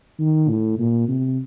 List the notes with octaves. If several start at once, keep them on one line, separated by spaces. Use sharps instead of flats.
D#3
A2
A#2
C3